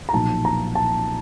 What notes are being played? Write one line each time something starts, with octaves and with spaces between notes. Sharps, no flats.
A#5
B1 A#2 F3 A5
A#5
A5